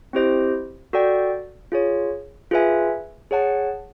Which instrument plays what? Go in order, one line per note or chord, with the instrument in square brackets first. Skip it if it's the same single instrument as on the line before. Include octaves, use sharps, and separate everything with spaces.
[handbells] C4 E4 G4 C5 D#5
F#4 A4 D5 G5
F4 G#4 C#5
F4 G#4 B4 E5 G#5
G#4 C#5 F#5 A5